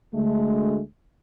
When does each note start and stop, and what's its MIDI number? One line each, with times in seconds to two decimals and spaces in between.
0.14 0.80 38
0.14 0.80 56
0.14 0.80 57